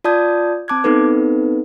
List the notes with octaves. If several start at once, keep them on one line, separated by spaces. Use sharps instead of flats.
F4 D5 A5 D#6 G6 G#6
C4 A5 D6 F#6 G#6
B3 C4 D#4 A4 B4